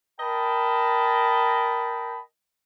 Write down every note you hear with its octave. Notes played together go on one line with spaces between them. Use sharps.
A#4 D#5 G5 A5 B5